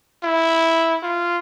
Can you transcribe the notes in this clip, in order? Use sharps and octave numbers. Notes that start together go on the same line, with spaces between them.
E4
F4